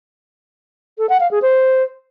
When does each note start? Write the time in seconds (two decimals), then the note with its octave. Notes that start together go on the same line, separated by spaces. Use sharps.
0.98 A4
1.09 F#5
1.20 F5
1.31 G#4
1.42 C5